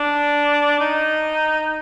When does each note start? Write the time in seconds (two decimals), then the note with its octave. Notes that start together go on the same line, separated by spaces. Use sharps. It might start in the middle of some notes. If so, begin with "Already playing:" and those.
Already playing: D4
0.80 D#4